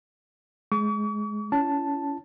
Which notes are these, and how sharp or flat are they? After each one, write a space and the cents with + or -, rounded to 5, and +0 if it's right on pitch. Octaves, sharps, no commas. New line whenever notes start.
G#3 +15 C#6 +45
C#4 +25 E4 +40 A5 +0